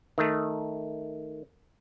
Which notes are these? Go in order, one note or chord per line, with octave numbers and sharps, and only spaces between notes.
D#3 A3